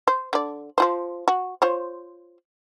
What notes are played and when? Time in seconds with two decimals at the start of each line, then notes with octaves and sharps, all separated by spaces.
0.08 C5
0.33 D3 D5
0.78 F3 F4 C5
1.28 F#4
1.62 F4 C5 C#5